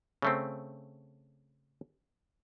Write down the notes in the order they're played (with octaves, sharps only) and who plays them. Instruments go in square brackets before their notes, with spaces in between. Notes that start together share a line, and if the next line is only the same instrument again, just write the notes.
[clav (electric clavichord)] C#3 A3 C4